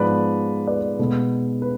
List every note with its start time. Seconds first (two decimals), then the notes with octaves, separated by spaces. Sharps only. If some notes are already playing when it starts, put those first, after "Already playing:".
Already playing: G#2 F3 G#3 B3 B4 D5
0.67 B4 D5
0.99 B2 G#3 B3
1.62 B4